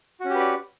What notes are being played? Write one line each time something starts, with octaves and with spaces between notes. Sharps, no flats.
C#4 F#4 G4 B4 D5